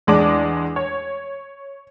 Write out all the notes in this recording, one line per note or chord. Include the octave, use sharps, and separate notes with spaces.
E2 G#3 D4 D6
C#5